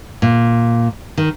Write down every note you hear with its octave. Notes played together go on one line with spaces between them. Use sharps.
A#2
D#3